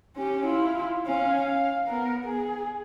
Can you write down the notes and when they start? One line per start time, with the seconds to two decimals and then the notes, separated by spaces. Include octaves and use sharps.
0.17 C#4 G4
0.46 E4 F4
1.06 C#4 F5
1.43 F5
1.87 B3 A#4
2.25 G#4